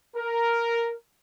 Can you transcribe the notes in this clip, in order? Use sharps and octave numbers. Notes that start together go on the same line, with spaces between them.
A#4